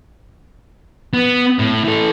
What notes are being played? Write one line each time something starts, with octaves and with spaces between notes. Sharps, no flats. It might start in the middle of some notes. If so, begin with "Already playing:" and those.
B3
A2
E3 A4